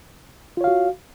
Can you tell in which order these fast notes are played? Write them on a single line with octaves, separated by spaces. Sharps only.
F4 C#5 F5 F#4